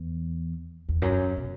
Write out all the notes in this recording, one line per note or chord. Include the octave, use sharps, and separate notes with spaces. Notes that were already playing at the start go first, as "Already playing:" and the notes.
Already playing: E2
E2
F#2
B2